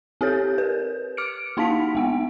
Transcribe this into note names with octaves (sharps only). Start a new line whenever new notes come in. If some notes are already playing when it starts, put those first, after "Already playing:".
C4 G4 A4 C#5 G6
A#4 B4
D6 F6 C#7 D7
A#3 D#4 E4 F5 A5 B6
G#3 B3 F#5